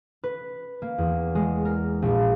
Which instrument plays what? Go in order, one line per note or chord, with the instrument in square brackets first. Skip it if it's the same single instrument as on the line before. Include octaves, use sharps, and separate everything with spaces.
[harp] B4
A#3
E2
G#3
A#4
A#1